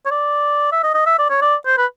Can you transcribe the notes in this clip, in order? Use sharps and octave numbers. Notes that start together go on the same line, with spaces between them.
C#5
D5
E5
D#5
D#5
E5
D5
C#5
D5
C5
B4